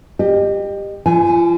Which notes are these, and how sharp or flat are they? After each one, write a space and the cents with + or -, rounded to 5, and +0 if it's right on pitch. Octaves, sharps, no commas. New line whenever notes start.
G4 +15 D#5 -30
F3 -40 G#5 +0